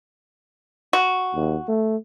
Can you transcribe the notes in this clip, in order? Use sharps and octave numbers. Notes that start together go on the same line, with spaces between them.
F#4
D#2
A3